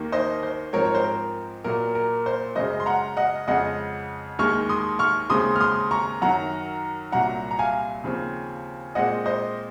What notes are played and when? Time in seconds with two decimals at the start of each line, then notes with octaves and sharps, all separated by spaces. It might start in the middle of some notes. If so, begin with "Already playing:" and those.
Already playing: D#2 D#3 A#3
0.12 C5 D#5
0.43 C5
0.73 G#2 F3 C4 A#4 C#5
0.85 C#5
0.95 C5
1.04 A#4
1.64 A#2 F#3 A#3 A#4
1.95 A#4
2.26 C5
2.56 F#2 C#3 G#3 C5 D#5
2.80 C6
2.86 F#5 A#5
3.17 D#5 F#5
3.47 F2 C#3 G#3 D#5 F#5
4.39 D#2 D#3 G#3 C#6 F6
4.69 C6 D#6
4.99 C#6 F6
5.30 D#2 C#3 G#3 C4 C6 D#6
5.56 F6
5.60 C6 D#6
5.91 A#5 C#6
6.22 F#2 D#3 F#3 F#5 A#5
7.12 C2 A#2 F#3 F#5 A#5
7.51 A#5
7.59 F5 G#5
8.04 D#2 C#3 F3 C4
8.95 A#2 G#3 C4 D#5 F#5
9.26 C5 D#5